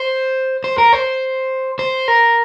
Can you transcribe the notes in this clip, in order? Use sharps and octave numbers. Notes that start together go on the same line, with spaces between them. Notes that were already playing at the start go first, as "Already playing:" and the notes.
Already playing: C5
C5
A#4
C5
C5
A#4